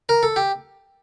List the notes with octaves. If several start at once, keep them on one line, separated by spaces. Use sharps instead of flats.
A#4
A4
G4